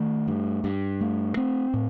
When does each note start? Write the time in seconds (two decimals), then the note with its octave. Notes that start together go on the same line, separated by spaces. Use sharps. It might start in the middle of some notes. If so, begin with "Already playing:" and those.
Already playing: D#3 A3
0.28 G2
0.64 G2
1.01 A3
1.37 C4
1.74 A2